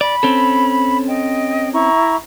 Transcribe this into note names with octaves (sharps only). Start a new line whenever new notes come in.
D5 B5
C4 C#4 A4
D#5 G5
E4 A#5 C#6